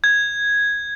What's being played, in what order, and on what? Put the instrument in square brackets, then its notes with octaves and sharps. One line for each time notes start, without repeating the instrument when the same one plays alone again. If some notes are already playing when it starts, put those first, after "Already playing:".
[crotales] G#6